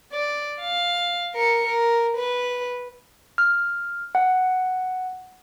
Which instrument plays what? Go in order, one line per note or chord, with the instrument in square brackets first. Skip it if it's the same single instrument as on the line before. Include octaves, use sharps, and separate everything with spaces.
[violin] D5
F5
A#4 C#7
A#4
B4
[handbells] F6
F#5